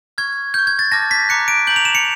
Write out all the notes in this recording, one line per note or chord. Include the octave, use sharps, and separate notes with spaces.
C#6 F6 G#6
C#6 F6 G6
G#6
A6
A5 D6 F6 A#6
B6
A#5 D6 F#6 C#7
D7
A#5 D6 G6 F#7
F7
E7
C#7